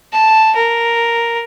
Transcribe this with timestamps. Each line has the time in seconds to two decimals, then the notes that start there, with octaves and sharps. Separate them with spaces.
0.12 A5
0.55 A#4